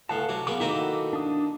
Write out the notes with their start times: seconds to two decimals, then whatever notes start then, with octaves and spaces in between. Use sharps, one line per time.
0.09 C#2 A2 F5 F#5 A5
0.29 C3 F#3
0.47 C#3 A#3 B3 D6
0.60 D#3 A#3 C4 E4 F#4 A4
1.13 D4 D#6